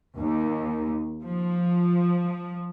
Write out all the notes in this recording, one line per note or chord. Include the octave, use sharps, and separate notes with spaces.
D#2
F3